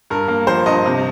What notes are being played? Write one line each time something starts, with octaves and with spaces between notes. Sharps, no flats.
G2 A#4
A#3
F3 C5
G2 D#5
C3